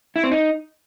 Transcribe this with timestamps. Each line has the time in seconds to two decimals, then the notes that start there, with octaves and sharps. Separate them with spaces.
0.16 E4
0.24 C4
0.31 D#4